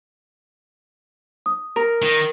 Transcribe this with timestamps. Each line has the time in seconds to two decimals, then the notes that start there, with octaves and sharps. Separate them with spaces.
1.46 D#6
1.76 A#4
2.03 D#3